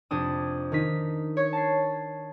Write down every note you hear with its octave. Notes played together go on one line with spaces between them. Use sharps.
F2 C3 D4 D#6
D#3 D#4 B6
C#5
A5 C7